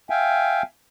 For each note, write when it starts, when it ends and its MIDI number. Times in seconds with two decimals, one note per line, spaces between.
0.10 0.63 76
0.10 0.63 77
0.10 0.63 79
0.10 0.63 80